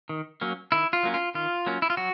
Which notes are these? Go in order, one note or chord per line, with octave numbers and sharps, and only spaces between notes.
D#3
F#3 A#3 C#4
D#3 E4
F4
F#3 A#3 C#4
F4
D#3 F4
F#3 A#3 C#4
E4
F4
F#3 F#4